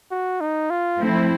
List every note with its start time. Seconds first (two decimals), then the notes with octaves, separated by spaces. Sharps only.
0.11 F#4
0.41 D#4
0.70 F4
0.99 F3 A3 C4 E4